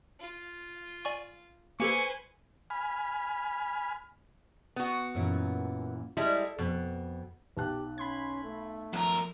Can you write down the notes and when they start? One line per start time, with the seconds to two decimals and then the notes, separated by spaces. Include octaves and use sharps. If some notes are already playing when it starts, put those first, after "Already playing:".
0.20 F4
1.05 D5 G#5 C#6
1.80 A#3 G4 A4 B4 C5 G#5 C#6
2.70 G#5 B5 F6
4.76 B3 F#4
5.15 F#2 A#2 E3
6.17 G3 G#3 E4 A4
6.59 F2 B2
7.57 B1 G4 A5 F#6
7.98 C#4 B5 C6 G#6
8.44 A3
8.93 B1 F3 A#4